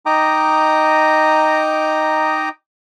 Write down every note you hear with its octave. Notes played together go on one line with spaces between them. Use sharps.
D#4 D#5 G5 A#5 D6 D#6